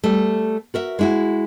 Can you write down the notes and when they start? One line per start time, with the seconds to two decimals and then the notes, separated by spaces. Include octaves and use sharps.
0.04 G3 A3
0.74 F#4 A#4 E5
0.99 G#3 E4 F#4